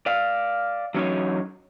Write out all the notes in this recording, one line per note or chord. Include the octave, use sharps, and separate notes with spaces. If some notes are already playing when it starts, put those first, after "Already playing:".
D5 F5
E3 F#3 C#4 D#4 C#5